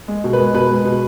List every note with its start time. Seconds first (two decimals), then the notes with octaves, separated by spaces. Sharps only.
0.08 G#3
0.24 B2
0.33 B4
0.39 G#3
0.54 B2 B4
0.71 G#3
0.85 B2